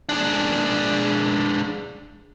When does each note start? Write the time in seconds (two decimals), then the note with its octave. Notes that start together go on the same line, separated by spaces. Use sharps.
0.09 G#3 D4